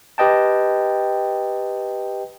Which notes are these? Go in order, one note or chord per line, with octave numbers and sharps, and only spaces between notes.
G4 B4 D#5 G5 A5